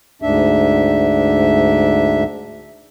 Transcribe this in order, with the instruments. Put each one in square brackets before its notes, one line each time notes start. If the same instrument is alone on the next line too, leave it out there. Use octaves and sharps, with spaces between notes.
[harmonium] D2 G#2 D4 E5